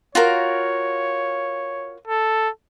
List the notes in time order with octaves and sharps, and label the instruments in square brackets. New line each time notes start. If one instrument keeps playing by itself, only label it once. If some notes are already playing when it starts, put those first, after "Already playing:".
[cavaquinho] F4 F#4 A#4 [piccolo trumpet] C#5
[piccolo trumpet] A4